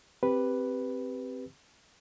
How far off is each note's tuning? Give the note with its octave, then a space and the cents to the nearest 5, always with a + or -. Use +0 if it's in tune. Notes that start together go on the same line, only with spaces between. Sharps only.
C4 +0 G4 +0 B4 +0